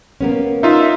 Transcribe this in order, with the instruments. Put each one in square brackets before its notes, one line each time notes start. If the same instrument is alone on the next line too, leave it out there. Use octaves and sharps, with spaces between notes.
[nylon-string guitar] A#3 B3 C#4
[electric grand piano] D#4 F4 [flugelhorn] E5